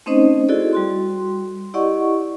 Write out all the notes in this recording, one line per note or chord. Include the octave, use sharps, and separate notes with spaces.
A3 C4 C#4 D#4 C5 D#5
E4 F#4 G#4 A4 D5 D#5
G3 F#4 C6
E4 G4 D5 D#5 F#5 C#6